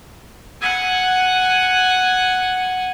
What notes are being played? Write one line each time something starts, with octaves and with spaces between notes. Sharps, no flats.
F#5 G#5